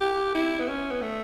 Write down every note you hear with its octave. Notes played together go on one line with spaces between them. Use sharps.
G4
E4
B3
C#4
B3
A3